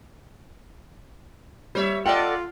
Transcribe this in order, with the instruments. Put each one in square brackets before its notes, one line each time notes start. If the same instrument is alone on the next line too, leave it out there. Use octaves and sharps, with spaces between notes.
[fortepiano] G3 [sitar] C5 C#5 E5
[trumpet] F4 [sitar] A4 D#5 [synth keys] D5 F#5 [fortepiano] G5